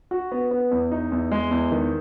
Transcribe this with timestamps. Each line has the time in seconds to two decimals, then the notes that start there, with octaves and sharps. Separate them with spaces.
0.11 F#4
0.32 B3
0.51 B3
0.71 E2
0.91 D#4
1.12 E2
1.31 G#3
1.51 E2
1.72 D#3